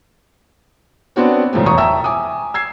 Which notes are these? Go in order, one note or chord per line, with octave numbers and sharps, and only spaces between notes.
B3 C4 D4 F#4 C#5
G#2 C#3 F3 G3 A3 G4
E1 A#5 C#6 D#6
E5 G5 A5 A#5 E6
G#5 D6 D#6
E6 G#6 C7